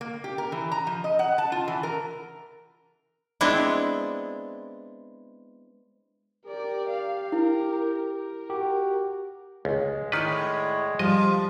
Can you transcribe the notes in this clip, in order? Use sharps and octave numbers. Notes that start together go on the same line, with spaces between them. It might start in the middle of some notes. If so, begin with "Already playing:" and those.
A#3
G4
A#4
E3
A#5
F3
D#5
F#5
A5
F4
E3
A#4
G#3 B3 C4 D4 E4
G4 A#4 D5
F5
E4 A#4
A#4
F#4 G4
C#2 G#3
A2 D#3 B4 D5
F3 G3 D#5